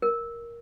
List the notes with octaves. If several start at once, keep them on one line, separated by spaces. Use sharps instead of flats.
A#4